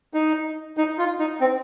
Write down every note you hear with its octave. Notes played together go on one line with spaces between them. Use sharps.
D#4
D#4
F4
D#4
C4